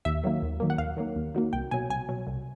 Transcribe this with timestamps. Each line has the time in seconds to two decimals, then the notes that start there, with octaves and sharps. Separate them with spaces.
0.05 D#2 E5
0.24 D#3 F#3 A#3
0.42 D#2
0.60 D#3 F#3 A#3
0.70 F#5
0.78 D#2 F5
0.97 D#3 F#3 A#3
1.16 D#2
1.34 D#3 F#3 A#3
1.53 C2 G5
1.71 B2 F#3 G#5
1.89 C2 G#5
2.09 B2 F#3
2.27 C2